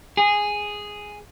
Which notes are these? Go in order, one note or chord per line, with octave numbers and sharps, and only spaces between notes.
G#4